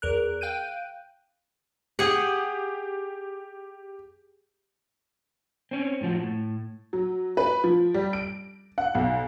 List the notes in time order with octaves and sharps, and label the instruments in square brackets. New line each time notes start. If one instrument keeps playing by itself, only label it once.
[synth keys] E2 A#4 F#6
F5 G5 F#6 G6 D7 D#7
[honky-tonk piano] G4 [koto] G#4 F#5
[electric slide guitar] C4 C#4
A2 F3 F#4
A2
[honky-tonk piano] F#3
B4
F3
G3
D7
F#5
B1